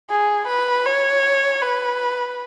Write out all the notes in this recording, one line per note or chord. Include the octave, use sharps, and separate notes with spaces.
G#4
B4
C#5
B4